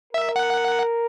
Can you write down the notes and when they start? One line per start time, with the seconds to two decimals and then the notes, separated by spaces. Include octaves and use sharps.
0.14 A#4 E5
0.36 F#5